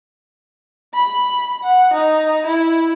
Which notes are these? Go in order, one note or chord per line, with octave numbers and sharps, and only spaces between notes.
B5
F#5
D#4
E4